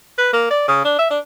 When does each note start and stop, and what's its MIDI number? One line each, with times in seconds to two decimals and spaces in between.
0.19 0.32 71
0.33 0.47 58
0.51 0.66 74
0.68 0.81 49
0.85 0.97 62
0.99 1.09 76
1.11 1.19 62